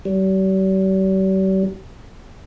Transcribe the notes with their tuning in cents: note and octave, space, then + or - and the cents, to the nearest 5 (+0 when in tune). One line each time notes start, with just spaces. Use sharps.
G3 -45